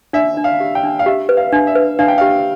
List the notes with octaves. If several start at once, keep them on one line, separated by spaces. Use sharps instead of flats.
D4 E5
D4
F5
G4
G5
D4
F5
G4 E5
B4
F5
D4
E5
B4
D4 F5
G5
G4 F5